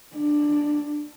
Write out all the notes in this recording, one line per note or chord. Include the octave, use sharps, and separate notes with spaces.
D4